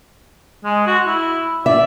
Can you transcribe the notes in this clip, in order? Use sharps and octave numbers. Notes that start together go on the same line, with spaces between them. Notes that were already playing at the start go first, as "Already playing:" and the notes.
G#3
F#4
E4
D5 E5